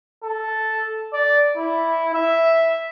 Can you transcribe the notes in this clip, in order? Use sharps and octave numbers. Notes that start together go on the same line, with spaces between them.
A4
D5
E4
E5